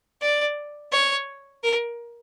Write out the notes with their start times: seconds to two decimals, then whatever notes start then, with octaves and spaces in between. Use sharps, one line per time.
0.22 D5
0.92 C#5
1.63 A#4